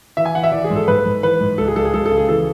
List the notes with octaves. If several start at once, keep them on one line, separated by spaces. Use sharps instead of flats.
E3 E5
G#5
E3 F#5
E5
E3 D5
G#4
G#2
A4
G#2 B4
G#2
E3 B4
G#2
C#2 A4
G#4
C#2 A4
G#4
C#2 A4
A4
C#3
G#4
E3 A4